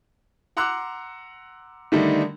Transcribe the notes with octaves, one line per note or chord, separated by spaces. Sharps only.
F#5 A#5 C6 D6 E6 F#6
D3 D#3 G3 A3 D4 D#4